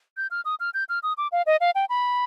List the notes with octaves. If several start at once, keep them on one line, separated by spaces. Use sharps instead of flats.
G6
F6
D#6
F6
G6
F6
D#6
D6
F5
D#5
F5
G5
B5